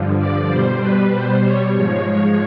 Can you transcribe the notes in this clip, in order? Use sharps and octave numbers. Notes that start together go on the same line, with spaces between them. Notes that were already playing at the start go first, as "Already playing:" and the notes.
Already playing: G2 D3 F3
D5
B2 G3 C5
B4
C5
C#5
G#2 F3 G#3 C#5